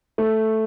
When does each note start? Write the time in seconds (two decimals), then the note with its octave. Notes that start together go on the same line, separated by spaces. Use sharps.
0.18 A3